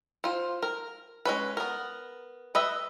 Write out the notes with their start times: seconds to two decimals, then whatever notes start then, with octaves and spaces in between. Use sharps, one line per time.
0.24 F4 C5
0.63 A#4
1.25 G#3 C#4 B4
1.57 B3 A#4
2.55 B4 D#5 E5